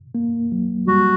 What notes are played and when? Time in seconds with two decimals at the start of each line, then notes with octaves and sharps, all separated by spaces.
0.15 A#3
0.52 F#3
0.88 G3 F#4